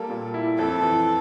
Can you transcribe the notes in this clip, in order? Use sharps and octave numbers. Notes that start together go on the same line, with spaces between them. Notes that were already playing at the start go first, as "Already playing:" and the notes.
Already playing: G3 A#3 A4
A#2
E4
F2 A4
E3